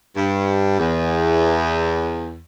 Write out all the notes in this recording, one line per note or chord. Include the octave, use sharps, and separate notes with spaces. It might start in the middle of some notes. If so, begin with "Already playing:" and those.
G2
E2